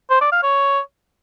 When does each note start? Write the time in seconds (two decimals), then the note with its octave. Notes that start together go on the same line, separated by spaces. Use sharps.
0.10 C5
0.21 D5
0.32 F5
0.43 C#5